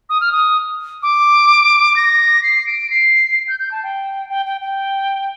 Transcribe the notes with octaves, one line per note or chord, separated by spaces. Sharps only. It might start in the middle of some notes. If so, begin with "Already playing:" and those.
D#6
F6
D#6
D6
A#6
C7
D7
C7
G6
G6
A5
G5
G5
G5
G5